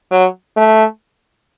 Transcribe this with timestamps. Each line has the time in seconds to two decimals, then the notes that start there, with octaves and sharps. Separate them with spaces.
0.12 F#3
0.57 A3